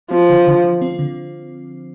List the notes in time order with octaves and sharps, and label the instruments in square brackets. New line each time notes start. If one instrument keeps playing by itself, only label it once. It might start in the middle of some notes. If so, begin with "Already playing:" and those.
[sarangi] F3 [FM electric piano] C4
[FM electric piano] D3
D3
F3
C4
D3